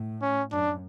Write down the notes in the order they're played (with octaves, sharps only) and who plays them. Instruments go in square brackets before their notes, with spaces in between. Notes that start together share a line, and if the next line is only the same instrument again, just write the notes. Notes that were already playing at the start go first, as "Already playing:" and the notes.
Already playing: [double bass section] A2
[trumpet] C#4
[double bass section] F#2 [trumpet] D4